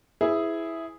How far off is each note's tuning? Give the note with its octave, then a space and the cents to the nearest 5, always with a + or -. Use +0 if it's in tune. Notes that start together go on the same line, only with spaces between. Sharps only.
E4 -5 G#4 +0 B4 +40